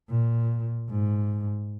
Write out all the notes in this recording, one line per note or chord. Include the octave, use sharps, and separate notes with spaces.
A#2
G#2